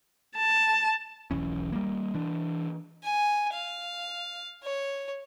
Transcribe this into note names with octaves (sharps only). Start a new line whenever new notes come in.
A5
E1 B1 E3 C#4
G3 A#3
E3 D4
G#5
F5
C#5